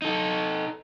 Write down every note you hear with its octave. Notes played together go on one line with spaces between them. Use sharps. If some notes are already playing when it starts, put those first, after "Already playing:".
D#4 A4